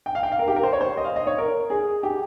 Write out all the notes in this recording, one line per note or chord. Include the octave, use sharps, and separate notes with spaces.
G5
F5
G5
F5
A#4
G4
A#4
C5
C#5
C5
D#5
F5
D#5
C#5
A#4
G#4
G4